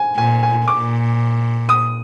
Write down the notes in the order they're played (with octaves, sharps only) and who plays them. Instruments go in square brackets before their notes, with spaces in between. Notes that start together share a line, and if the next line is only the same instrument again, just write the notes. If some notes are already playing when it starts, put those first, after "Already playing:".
Already playing: [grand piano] G#5
[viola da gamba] A#2 [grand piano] G#5
[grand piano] G#5
[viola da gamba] A#2 [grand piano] D6
[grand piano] D#6